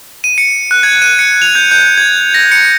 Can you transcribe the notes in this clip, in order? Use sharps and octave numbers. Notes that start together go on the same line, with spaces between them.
D#7
C#7
F#6
G#6
D#7
C#7
F7
G6
G6
G#6
A#6
C#7